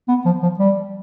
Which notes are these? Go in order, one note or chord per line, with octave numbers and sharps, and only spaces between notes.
B3
F3
F3
G3